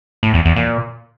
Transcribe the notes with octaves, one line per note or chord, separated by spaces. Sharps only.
A2
E2
E2
A#2